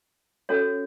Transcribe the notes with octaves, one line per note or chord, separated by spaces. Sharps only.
C#4 F#4 A4 C#5